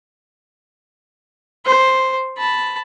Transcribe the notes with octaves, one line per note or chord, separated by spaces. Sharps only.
C5
A5 B5